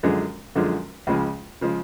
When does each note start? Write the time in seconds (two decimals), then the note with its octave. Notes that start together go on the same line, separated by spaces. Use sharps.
0.03 F#2 D3 F3 G#3
0.55 F#2 D3 F3 G#3
1.07 C#2 C#3 F3 G#3
1.61 C#3 F3 G#3